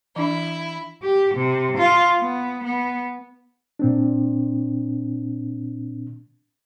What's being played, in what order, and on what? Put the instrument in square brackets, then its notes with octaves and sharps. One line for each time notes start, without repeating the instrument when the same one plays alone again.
[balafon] E3 D4 [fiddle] E4
[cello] G4
C3
F4
B3
B3
[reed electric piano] A#2 C4 D4